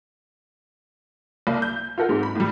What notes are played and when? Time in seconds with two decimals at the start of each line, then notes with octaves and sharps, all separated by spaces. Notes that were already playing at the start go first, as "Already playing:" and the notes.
1.47 C2 A#3
1.62 G6
1.98 F4 A4 A#4 F#5
2.09 G#2 G#3 C4
2.23 B5
2.35 A2 G3